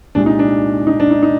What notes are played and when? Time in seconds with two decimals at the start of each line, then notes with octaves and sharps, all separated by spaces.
0.15 C2 A#2 G#3 D4
0.26 D#4
0.39 D4
0.87 D#4
1.00 D4
1.11 D#4
1.23 D#4